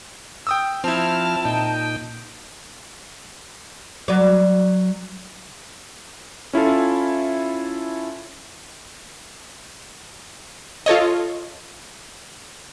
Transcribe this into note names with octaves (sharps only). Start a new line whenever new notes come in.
G5 D#6 E6
F3 C4 E4 A5 F6
A#2 D#4 G5
F#3 D5
C#4 E4 F4 A4
F4 A4 C#5 D#5